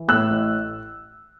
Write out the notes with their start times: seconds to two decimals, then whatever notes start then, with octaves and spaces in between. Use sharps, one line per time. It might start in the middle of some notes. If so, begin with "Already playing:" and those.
Already playing: E3
0.08 A2 E6 F#6
0.31 A1